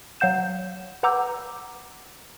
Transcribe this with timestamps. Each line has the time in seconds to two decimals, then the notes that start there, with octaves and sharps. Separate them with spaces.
0.20 F#3 F5 F#5 G6 E7
1.03 B4 F#5 A#5 D6 E6 G6